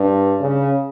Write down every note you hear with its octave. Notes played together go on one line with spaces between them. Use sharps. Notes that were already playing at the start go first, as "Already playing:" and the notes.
Already playing: G2
C#3